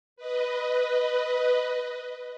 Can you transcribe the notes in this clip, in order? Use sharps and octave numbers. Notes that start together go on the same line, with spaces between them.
B4 D#5